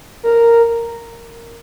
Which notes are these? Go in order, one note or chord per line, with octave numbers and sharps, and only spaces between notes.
A#4